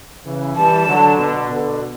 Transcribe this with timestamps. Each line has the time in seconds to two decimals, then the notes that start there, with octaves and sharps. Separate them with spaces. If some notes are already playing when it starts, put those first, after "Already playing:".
0.24 C#3 E3
0.55 E3 G3 A5
0.86 D3 F#3
1.18 B2 D3
1.49 B2 D3